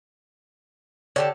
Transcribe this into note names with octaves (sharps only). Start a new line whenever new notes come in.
D3 G4 C#5 D5 A5